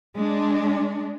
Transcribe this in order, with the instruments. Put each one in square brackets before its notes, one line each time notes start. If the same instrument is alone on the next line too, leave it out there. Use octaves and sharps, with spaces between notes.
[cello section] G#3 D4